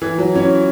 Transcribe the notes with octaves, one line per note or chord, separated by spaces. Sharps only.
E3
F#3
C#4 E4